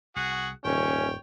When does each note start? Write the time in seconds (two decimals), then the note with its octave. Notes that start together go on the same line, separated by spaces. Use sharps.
0.16 C2 F#4 G#4 F#5
0.65 D#1 G#1 E2 C#3 C#4 C#5 G5